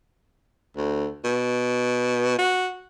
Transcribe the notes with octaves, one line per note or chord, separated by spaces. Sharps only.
D2
B2
F#4